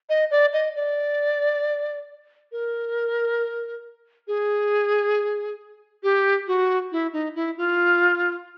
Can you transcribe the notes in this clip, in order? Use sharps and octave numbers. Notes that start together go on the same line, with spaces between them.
D#5
D5
D#5
D5
A#4
G#4
G4
F#4
E4
D#4
E4
F4